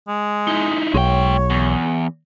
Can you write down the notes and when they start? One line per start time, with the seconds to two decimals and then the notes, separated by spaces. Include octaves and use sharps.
0.08 G#3
0.48 D#4 E4
0.94 B1 G#3 C#5 G5
1.50 E2